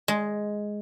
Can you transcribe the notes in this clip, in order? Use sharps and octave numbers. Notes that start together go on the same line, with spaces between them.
G#3